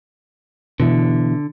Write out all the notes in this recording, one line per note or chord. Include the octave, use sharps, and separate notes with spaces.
B2 D3 E3